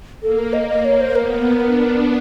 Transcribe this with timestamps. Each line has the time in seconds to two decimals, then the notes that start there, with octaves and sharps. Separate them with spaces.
0.22 A#3 A4
0.38 A#4
0.53 D#5
0.69 D#5
0.85 C#5
1.01 C5
1.15 B3 A#4
1.62 D4